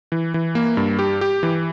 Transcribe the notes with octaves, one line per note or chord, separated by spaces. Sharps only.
E3
E3
A#3
G2
G4
G4
E3